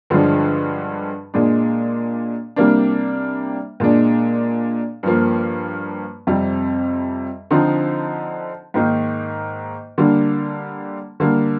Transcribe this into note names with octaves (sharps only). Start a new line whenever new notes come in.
G2 D3 F3 G#3 D4
A#2 G#3 D4
C3 G3 A#3 D4
A#2 G#3 D4
G2 F3 A#3
F2 C3 G3
D3 F3 C4 D#4
G#2 D#3 A#3 D#4
D3 G3 A#3 D4
D3 G3 A#3